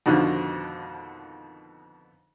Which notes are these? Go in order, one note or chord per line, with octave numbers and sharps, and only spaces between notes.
F2 G#2 B2 D3 D#3 F3